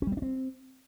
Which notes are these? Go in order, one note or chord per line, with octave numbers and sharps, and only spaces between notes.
C#4
G3
B3
D4
C4